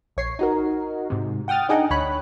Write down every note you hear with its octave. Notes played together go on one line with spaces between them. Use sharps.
A#1 C#5 C7
D#4 F#4 A#4
G#2 C3
F#5 G5 D#6 F6 A6
D4 D#4 G#4 D#5 F#5 G5
D2 C#5 B5 F#6